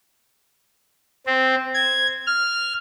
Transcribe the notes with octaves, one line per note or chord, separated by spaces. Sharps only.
C4
G#6
F6